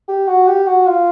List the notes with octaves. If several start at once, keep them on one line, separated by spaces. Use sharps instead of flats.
G4
F#4
G4
F#4
F4